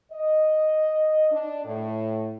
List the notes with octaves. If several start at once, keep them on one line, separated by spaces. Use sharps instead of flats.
D#5
D4
A2